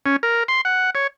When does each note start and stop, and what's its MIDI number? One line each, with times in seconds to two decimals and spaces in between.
0.06 0.16 61
0.23 0.43 70
0.48 0.61 84
0.65 0.90 78
0.95 1.07 73